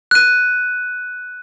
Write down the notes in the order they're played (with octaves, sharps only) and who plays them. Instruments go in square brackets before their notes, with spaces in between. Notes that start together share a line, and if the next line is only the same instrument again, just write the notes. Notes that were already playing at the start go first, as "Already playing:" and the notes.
[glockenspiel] F#6 D#7